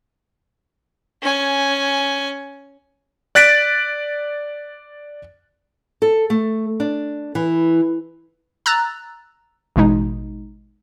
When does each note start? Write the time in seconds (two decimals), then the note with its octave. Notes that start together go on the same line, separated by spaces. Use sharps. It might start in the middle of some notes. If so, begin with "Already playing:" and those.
1.22 C#4 G#5
3.35 D5 F#6 A6 B6 D7
6.02 A4
6.30 A3
6.80 D4
7.35 E3
8.66 A#5 E6 F#6 A6
9.76 A1 B2 G#3 D#4